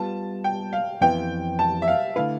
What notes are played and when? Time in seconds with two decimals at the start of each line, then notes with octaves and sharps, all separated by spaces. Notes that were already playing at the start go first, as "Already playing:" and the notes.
Already playing: G3 B3 F4 A5
0.44 G5
0.73 F5
1.01 F2 E3 B3 G5
1.59 A5
1.82 E5
1.88 F5
2.16 D3 A3 E4 B4 F5